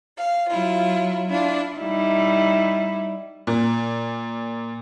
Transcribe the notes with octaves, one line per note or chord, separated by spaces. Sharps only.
F5
F#3 E4 F4
D4 E4 F4
G3 D#4 E4
A#2